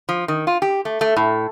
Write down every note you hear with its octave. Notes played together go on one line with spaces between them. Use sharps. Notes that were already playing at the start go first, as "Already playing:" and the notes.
F3
D#3
F4
G4
A3
A3
A2